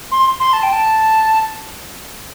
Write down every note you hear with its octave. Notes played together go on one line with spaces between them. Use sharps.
C6
C6
A5
G5
A5